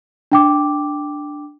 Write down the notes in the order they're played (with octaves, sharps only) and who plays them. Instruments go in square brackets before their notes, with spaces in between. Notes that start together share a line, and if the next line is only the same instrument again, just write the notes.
[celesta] D4 G5 D6